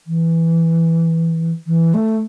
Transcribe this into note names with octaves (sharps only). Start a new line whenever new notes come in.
E3
E3
A3